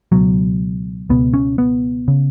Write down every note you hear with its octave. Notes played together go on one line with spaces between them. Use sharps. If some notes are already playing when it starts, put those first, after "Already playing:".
C#2 B2 F#3
C#2 B2 B3
C#4
B3
C#3